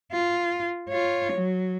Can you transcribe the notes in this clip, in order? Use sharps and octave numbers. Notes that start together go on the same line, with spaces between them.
F4
F4 C#5
F#3